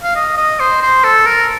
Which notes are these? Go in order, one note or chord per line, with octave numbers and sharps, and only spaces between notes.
F5
D#5
D#5
C5
C5
A4
A#4